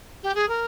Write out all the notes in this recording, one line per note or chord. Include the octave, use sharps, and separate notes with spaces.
G4
G#4
A#4